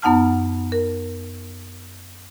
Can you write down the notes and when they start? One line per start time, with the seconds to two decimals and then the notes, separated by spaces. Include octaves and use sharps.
0.02 F#2 B3 D#4 F#5 A5 F6
0.72 A#4